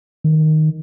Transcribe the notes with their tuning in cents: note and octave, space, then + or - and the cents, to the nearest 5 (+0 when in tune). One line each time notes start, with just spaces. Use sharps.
D#3 +0